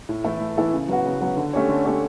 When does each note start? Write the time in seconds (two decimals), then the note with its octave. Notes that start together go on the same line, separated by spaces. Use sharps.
0.09 A2
0.24 E3 A3 E4 A4
0.40 A2
0.57 E3 A3 E4 A4
0.74 C#3
0.89 F#3 B3 F#4
1.05 C#3
1.21 F#3 B3 F#4
1.37 D3
1.53 A3 C#4 G4 C#5
1.69 D3
1.85 A3 C#4 G4 C#5